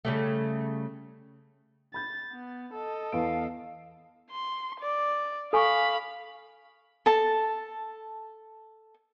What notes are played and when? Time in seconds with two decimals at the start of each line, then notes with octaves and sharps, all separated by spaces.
0.05 C#3 G3 A3
1.94 B5 G6 A6
2.33 B3
2.73 A4 D#5
3.12 E2 B3 F5 D7
4.31 C6
4.80 D5
5.53 A4 F5 G#5 B5 C#6
7.06 A4 A5